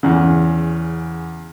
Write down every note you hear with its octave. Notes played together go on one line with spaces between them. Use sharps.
E2 C#3